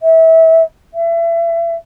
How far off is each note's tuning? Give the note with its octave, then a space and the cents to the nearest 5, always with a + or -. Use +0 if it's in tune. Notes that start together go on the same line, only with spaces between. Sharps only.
E5 -25
E5 +30